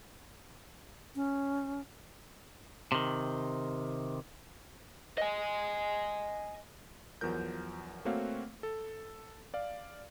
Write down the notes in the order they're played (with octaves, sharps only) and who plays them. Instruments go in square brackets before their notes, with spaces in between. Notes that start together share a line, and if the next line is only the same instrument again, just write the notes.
[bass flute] C#4
[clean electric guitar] C3 D#3
[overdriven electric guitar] D#5 G#5
[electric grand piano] E2 F3 F#3 A#4 G6
A3 A#3 C4 F#4 C#5 F5
A4
D5 F5